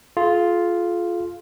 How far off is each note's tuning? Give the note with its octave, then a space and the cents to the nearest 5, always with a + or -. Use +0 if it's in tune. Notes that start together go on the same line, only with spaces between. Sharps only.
F4 +0 G#4 +45